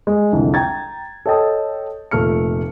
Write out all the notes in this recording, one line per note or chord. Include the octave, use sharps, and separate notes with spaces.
G#3
C2 F2 D3
G5 A#5 G#6 A6
A4 C#5 D#5 G5 A5 D#6
F1 A#2 A3 F6 C#7